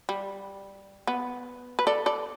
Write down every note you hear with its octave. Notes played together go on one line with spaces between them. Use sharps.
G3
B3
B4
A4 D5
A4 D5